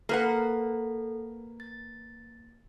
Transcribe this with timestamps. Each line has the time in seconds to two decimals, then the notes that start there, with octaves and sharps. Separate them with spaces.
0.09 A#3 A4 B4 F#5
1.60 A6